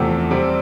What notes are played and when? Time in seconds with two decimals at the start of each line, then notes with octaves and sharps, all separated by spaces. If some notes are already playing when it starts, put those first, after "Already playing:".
Already playing: E2 C3 F3 A3 E6
0.31 C3 G3 C4